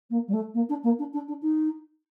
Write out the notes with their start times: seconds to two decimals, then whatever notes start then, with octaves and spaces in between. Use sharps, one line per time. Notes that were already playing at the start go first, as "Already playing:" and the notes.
0.10 A#3
0.28 G3
0.33 A3
0.54 A#3
0.69 D4
0.83 A#3
0.98 D4
1.13 D4
1.28 D4
1.42 D#4